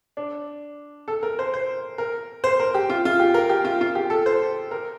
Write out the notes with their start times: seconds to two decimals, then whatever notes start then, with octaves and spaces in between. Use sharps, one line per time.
0.17 D4
1.08 A4
1.23 A#4
1.39 C5
1.54 C5
1.98 A#4
2.44 C5
2.60 A#4
2.74 G4
2.90 F4
3.05 F4
3.19 G4
3.34 A#4
3.49 G4
3.65 F4
3.81 F4
3.95 G4
4.10 A4
4.26 C5
4.71 A#4